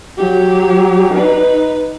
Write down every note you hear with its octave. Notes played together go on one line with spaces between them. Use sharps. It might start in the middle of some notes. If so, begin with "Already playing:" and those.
F#3 G4
D#4 B4